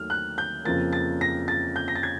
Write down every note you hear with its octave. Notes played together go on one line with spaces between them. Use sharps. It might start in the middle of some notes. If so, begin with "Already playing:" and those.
Already playing: D#2 D#3 F#3 A3 F6
F#6
G6
F2 C#3 F3 A#3 A6
A6
A#6
A6
G6
A#6
A6
G#6